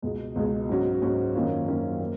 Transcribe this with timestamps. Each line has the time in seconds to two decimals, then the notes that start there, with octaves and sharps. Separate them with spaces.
0.02 C#2 B2 G#3
0.36 C#2 B2 G#3
0.69 G#2 F#3 C#4 F#4
1.02 G#2 F#3 C#4 F#4
1.34 F#2 D#3 A#3 C#4 F4
1.68 F#2 D#3 A#3 C#4 F4
2.00 A#3